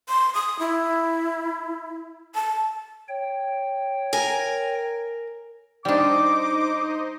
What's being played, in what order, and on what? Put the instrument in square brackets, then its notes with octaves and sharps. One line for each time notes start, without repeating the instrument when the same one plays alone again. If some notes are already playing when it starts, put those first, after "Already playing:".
[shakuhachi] C6
D#6
E4
A5
[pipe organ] C#5 G5
[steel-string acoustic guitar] A#4 G#5
[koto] G3 D4 [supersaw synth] D#4 C5 D#5 [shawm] D6